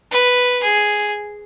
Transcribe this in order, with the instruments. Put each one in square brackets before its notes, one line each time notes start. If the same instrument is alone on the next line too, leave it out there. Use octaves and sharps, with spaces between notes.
[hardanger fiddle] B4
G#4